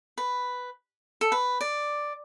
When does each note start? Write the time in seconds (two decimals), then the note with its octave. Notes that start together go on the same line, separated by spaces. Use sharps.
0.18 B4
1.21 A4
1.32 B4
1.61 D5